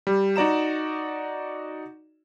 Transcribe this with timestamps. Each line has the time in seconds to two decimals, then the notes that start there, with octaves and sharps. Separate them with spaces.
0.07 G3
0.36 D#4 F#4 D5 A#5 E7